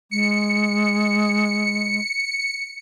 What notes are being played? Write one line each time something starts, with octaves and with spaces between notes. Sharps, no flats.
G#3 C#7